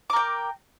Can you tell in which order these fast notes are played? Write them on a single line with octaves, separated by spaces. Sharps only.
D6 A#4 G5